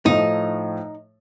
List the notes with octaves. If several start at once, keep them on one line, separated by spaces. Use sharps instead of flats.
A2 F3 A3 D#4